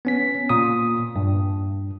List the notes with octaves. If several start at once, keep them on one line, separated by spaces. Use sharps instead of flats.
B3 C#4 B6
A#2 D#6
G2